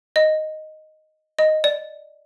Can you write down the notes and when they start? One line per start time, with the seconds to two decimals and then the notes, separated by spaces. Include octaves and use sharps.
0.16 D#5
1.39 D#5
1.64 D5